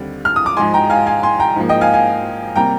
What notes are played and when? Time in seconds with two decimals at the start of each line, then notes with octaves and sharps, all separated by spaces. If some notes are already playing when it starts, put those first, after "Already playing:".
Already playing: D#2 D3 G3 C4
0.25 F6
0.36 D#6
0.46 D6
0.57 G#2 F3 G#3 G#5 C6
0.74 G5 A#5
0.90 F5 G#5
1.06 F5 G#5
1.23 G#5 C6
1.40 G5 A#5
1.56 G#2 F3 A#3
1.69 D#5 G5
1.81 F5 G#5
1.94 F5 G#5
2.56 C3 G3 A#3 G5 A#5